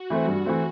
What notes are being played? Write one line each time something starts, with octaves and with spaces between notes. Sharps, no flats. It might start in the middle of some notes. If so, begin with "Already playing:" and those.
Already playing: F#4
E3 A3 C4
G2 F#4
E3 A3 C4